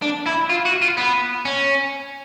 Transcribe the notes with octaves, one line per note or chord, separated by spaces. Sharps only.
D4
E4
F4
F#4
F4
B3
C#4